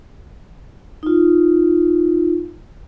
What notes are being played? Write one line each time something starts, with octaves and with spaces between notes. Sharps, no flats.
D#4 F4